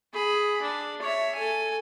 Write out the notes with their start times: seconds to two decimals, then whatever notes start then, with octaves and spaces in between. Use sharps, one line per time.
0.13 G#4 B5
0.62 D4
1.02 C#5 E5
1.35 A4 G#5